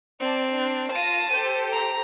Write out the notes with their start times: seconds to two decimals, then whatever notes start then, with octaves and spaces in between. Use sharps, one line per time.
0.21 C4 D5 A5
0.51 D4
0.92 F4 A5 A#6 D#7
1.31 G4 A4 C5
1.72 A#5